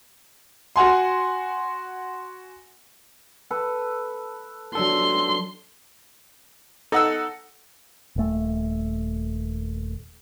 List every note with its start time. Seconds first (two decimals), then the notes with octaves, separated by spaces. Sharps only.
0.76 F#4 F#5 G#5 C6
3.51 A4 B4
4.75 F#3 D4 A4 C6
6.92 D#4 A4 F#5 E6
8.16 D#1 A3